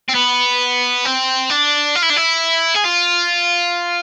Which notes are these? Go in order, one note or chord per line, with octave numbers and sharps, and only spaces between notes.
C4
B3
C4
D4
F4
E4
D4
E4
G#4
F4